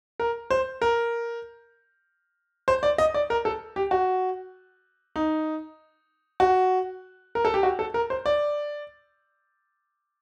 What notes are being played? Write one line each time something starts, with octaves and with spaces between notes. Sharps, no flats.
A#4
C5
A#4
C5
D5
D#5
D5
A#4
A4
G4
F#4
D#4
F#4
A#4
A4
G4
F#4
A4
A#4
C5
D5